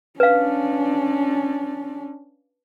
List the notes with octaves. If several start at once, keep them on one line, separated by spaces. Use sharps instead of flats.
C#4 D4 B4 F5